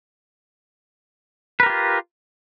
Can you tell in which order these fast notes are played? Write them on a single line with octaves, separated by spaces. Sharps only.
B4 A#4 G4 F4